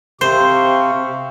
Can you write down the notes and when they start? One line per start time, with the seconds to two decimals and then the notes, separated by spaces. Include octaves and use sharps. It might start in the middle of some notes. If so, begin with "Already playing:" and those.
0.21 C3 G4 C5 F5 C#6